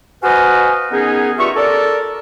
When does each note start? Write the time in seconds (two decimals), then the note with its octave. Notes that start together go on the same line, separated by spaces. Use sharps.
0.23 F#4 B4 C5 D#5 F5 G#5
0.91 D#3 B3 C#4 D#4 G#4
1.38 G2 F4 E5 C#6
1.56 A4 A#4 D5